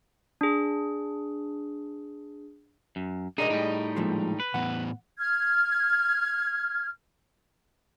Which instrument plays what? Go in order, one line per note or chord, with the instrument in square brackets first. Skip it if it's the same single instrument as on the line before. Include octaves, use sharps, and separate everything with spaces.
[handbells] D4 G#4
[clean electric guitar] F#2
[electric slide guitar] D4 A#4 [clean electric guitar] D#4 [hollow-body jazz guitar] G#4 D5 D#5
[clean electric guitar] A2 G3 [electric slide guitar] D#4
[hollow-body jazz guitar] A#2 F3 G#3
[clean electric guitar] B4
[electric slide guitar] A2 E3 B3 [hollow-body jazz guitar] F#5
[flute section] F6 G#6